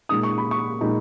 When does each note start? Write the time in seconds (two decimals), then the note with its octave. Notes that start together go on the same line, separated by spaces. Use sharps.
0.09 A#2 G#3 D#4 D#6
0.23 C#6
0.38 B5
0.51 C#6
0.81 A#2 G#3 D#4